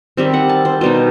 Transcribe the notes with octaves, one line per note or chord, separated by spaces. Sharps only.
D#3 G3 C4 E5
F#5
A5
C5
B2 G3 D#4 C5